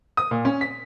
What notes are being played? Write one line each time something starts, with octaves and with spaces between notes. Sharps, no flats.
D#6
A#2
C#4
B6